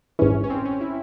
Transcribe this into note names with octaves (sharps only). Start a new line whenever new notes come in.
G#1 G#2 E3 C#4
C#4
C4
C#4
E4